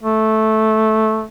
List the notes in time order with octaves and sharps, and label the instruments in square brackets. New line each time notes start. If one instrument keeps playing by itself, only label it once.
[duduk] A3